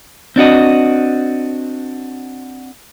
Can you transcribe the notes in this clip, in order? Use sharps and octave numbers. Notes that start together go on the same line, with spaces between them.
C4 D4 F#4 D#5